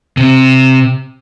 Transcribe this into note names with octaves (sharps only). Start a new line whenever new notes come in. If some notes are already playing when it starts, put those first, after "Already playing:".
C3